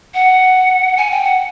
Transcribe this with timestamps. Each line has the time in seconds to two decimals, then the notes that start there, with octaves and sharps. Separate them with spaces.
0.14 F#5
0.97 G#5
1.11 G5
1.24 F#5